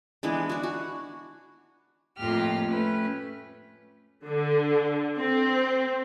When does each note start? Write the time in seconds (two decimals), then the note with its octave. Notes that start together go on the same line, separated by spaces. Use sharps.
0.23 E3 G#3 B3 D4
0.49 D4 F#4
0.63 F#4
2.16 F2 A2 A#3 F4 G4 F6
2.65 A3 C#4 B4
4.27 D3
5.18 C4